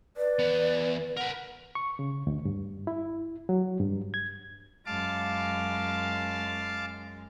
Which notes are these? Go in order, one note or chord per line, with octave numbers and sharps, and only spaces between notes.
B4 D5
E2 B3
A#4 B4 F#5
C#6
C#3
D2
G2
E4
F#3
G2
G#6
F#2 G#3 F5 A5 D6